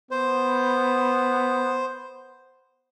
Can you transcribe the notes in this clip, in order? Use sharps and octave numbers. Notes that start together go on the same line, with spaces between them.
B3 C5